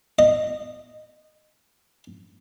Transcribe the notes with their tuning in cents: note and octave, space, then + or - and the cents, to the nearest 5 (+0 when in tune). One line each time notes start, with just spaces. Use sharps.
D#5 -20